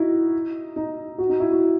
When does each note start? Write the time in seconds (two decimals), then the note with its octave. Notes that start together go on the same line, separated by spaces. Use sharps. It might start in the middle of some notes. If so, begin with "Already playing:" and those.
Already playing: D#4 E4 F#4
0.76 D#4
1.18 F#4
1.29 D#4
1.40 E4
1.51 F#4